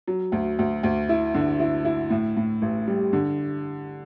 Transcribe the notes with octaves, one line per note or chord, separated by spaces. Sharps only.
F#3
D2
D2
D2
E4
D3
E4
E4
A2
A2
A1
G3
D3